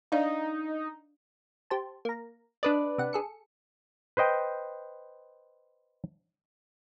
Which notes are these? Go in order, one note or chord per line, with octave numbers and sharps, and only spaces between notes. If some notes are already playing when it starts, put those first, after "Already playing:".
D4 D#4 D5 F5
G4 C5 A5
A#3 A#5
D4 B4 D5 D#5
C3 F#5
G#4 A4 C#7
B4 C5 D#5 G5